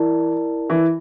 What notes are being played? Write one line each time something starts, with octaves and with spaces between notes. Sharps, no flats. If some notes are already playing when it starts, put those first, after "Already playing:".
Already playing: E3 E4 A#4 D5 A5
E3